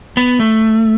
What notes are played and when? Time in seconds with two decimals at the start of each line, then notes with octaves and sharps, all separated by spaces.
0.17 B3
0.40 A3